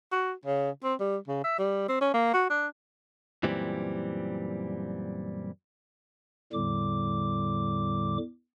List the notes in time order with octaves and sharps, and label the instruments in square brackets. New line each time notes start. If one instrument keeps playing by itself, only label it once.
[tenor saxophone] F#4
C#3
C4
G3
C#3
E5
G3
C4
C#4
A#3
F#4
D4
[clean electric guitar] F#2 A#2 E3 G3 C4
[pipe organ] E2 A2 D3 G3 D6